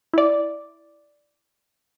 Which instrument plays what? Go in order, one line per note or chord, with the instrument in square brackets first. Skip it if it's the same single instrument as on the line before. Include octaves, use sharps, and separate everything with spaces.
[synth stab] E4 D5